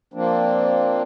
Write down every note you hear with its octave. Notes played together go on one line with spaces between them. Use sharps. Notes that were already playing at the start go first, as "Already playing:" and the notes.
F3 A#3 C4 D4